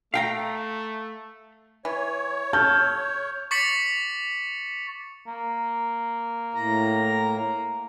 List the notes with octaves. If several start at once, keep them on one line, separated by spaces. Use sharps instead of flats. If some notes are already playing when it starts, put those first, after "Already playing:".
A3 F5 G5 A#5
E3 C#5
A4 F6 G6
C#6 D6 A6 B6 C#7 F#7
A#3
A2 A#5